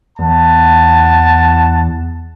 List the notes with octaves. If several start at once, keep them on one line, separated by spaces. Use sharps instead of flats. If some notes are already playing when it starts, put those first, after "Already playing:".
E2 F#5 A5